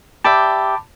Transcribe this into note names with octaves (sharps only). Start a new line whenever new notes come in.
G4 D5 E5 A5 B5 D6